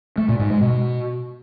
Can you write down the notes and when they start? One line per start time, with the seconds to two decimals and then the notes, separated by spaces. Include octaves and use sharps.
0.18 A3
0.28 A#2
0.39 G#2
0.50 G#3
0.61 B2